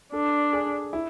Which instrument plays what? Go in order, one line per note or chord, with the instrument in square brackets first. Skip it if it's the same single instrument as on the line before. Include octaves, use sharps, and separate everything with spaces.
[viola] D4 [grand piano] A4
[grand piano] G#4
E4